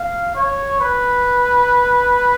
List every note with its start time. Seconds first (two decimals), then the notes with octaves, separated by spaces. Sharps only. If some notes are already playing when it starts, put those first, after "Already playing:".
Already playing: F5
0.36 C#5
0.80 B4